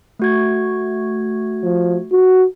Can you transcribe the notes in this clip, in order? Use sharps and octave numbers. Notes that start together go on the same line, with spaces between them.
A3 F#4 G#6
F3
F#4